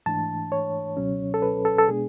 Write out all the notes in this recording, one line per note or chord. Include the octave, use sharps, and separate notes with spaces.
G#2 E3 A3 D4 A5
C#5
C#2 B2 F#3 C#4
A4
B4
A4
A4
B2 G#3 B3 D4 G#4